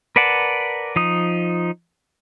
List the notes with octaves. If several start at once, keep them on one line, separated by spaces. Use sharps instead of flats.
A#4 B4 D5 F#5 A5
F3 D#4 D#6